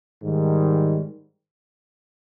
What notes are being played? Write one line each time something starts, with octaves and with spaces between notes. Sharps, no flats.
G#2 D#3 G3